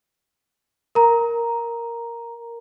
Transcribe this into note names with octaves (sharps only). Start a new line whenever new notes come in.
A#4 A#5